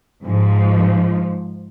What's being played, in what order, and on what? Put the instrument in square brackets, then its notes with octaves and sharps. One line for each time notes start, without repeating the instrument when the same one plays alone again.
[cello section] G#2 F3